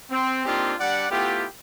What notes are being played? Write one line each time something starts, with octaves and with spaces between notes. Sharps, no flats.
C4
A#3 C4 D4 D#4 F4 G4
G3 D4 D5 F#5
A3 B3 E4 F4 G4